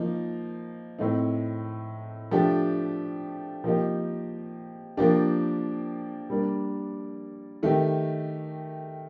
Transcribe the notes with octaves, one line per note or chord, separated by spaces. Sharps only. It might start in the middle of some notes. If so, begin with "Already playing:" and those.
Already playing: F3 A#3 D#4
A2 A3 C4 D#4
F3 A3 D4 G4
F3 A#3 D#4 G4
F3 A#3 D4 G4
G3 A#3 D4
D#3 A3 D#4 G4